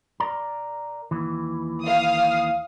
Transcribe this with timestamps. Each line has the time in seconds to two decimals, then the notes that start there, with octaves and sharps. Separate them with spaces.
0.20 A#4 D5 A#5
1.11 D#2 E3
1.83 F5 D#6